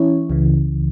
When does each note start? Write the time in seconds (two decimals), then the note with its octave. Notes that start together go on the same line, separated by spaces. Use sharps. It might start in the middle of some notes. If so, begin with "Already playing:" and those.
Already playing: E3 C#4 E4 C#5
0.30 C#2 C#3 E3